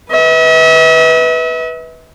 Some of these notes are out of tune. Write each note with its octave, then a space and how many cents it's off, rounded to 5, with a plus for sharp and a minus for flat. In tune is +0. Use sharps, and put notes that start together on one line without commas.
B4 +0 E5 -45